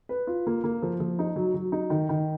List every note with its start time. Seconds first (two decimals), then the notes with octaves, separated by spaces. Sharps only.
0.09 B4
0.27 F4
0.47 A#3
0.64 A#3
0.82 F3
1.00 F3
1.19 D#4
1.36 F#3
1.54 F#3
1.72 D#4
1.90 D#3
2.09 D#3